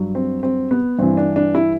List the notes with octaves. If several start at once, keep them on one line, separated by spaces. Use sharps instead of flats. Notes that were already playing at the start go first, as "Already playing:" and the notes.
Already playing: G2 F#3
C4
C4
B3
G2 E3 C4
D4
D4
E4